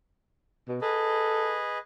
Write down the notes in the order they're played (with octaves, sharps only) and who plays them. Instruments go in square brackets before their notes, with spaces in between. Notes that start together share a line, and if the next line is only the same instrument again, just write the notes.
[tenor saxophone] B2
[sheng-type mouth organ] G#4 B4 D#5 [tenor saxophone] A4